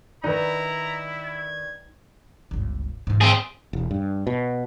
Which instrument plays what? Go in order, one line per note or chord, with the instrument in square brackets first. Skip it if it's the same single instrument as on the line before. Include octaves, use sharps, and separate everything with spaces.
[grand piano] D#3 B4 D5 [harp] D#4 [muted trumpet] E4 [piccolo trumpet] A#5
[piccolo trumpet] G#6
[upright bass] G1 C#2
G#2 E3
[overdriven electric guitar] C4 G#4
[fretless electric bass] E1
G2
B2